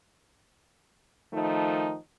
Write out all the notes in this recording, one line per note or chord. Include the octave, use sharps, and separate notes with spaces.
D#3 F3 A3 D#4